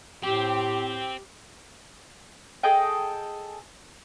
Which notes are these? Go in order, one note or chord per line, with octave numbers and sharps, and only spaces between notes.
A2 C4 G4
G#4 A4 D#5 G5